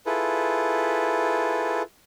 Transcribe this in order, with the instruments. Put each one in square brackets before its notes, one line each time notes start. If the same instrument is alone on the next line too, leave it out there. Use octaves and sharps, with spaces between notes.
[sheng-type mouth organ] E4 F4 G#4 A4 B4